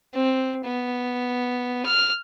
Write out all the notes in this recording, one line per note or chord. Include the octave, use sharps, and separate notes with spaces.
C4
B3
F6